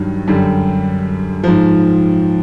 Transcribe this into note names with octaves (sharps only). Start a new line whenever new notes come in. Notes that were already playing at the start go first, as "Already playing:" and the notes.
Already playing: G2 D#3 F#3
F#2 D3 G3 G4
G#2 F3